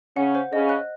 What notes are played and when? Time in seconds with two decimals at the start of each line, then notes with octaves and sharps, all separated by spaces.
0.16 C#3 C#4 F#5
0.35 C5
0.52 C#3 C#4 D#5
0.69 F#6